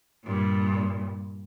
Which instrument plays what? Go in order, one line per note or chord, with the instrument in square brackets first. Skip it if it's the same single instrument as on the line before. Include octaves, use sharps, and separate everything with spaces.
[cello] G2 A#2